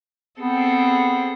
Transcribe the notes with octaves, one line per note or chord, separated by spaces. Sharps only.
B3 C4 G#4 A4